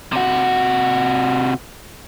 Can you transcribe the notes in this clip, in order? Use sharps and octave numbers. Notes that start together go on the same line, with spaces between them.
C3 F#4